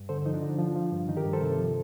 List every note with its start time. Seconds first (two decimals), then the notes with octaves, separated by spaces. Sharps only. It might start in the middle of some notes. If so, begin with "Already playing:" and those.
Already playing: G2
0.09 D3 A4 C5
0.26 F3 D#4
0.34 D4
0.42 D3
0.59 F3
0.76 F3
0.93 G2
1.08 D#3 D#4
1.17 G4 A#4
1.26 G2
1.33 A4 C5
1.41 C3
1.58 F3